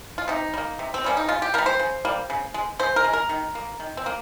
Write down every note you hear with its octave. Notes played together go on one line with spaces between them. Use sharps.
F4
C3 D#4
G3
A#3
C3
C4
G3 A#3 C#4
D#4
C#3 F4
G4
G3 A#3 A#4
C5
C#3
G3 A#3
C#3
G#3
C#3 C5
A#4
G#3
A#4
D#3
A#3
D#3
C4
A#3